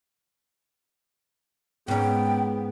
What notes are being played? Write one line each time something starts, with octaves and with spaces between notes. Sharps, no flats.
G#2 B3 C#4 G5